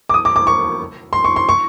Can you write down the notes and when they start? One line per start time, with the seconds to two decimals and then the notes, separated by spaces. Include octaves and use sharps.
0.09 D6
0.14 D#6
0.25 D6
0.36 D6
0.47 C#6
1.13 C6
1.24 C#6
1.36 C6
1.49 C#6